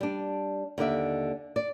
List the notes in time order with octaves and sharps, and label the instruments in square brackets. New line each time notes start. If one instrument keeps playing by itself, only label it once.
[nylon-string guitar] G3 D4
D#2 D3 D5 E5
D5